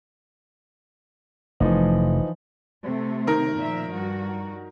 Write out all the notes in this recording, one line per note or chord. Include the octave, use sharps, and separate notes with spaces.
F1 E3 F3 A3 D#4
C3 A3
D#3 A#4
A#2 F3 E5
G2 F#4